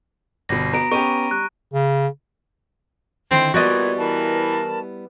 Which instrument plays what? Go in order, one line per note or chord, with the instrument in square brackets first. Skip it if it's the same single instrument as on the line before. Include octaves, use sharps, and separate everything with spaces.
[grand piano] G1 B2 [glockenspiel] A#6
[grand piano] B3 F#4 [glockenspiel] A#5 D7
[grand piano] B3 C#4 G4 [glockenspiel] C#6 D#7
[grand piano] G3 [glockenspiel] F#6
[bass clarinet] C#3
[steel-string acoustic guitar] D3 D#3 E4 [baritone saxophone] C4
[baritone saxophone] A#2 [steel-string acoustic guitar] G3 B3 E4 [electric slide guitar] F#4 D5 D#5 [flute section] G#6
[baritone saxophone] E3 [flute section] A#4 A5 B5